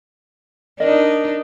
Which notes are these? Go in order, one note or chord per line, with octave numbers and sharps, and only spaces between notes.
D4 D#4 A#4 D#5